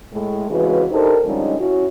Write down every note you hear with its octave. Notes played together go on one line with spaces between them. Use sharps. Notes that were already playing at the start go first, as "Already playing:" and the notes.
A2 G#3 A3
F2 C#3 E3 G#3 F#4 B4
D4 D#4 G4 A4 A#4 C5
D3 F3 G3 G#3 C#4 D#4
C#4 E4 F#4